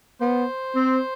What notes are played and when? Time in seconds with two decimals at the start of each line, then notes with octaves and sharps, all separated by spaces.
0.21 B3 C5
0.75 C4